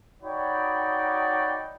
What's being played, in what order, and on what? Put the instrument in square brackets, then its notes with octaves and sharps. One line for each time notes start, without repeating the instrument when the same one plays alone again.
[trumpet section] D#4 F#4 C#5 D5 G5 B5